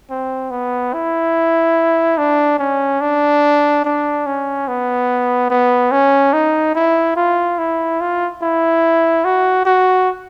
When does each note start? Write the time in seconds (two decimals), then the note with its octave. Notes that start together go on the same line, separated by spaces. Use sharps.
0.10 C4
0.51 B3
0.93 E4
2.18 D4
2.59 C#4
3.01 D4
3.85 D4
4.26 C#4
4.68 B3
5.50 B3
5.92 C#4
6.33 D#4
6.75 E4
7.16 F4
7.58 E4
8.00 F4
8.42 E4
9.25 F#4
9.66 F#4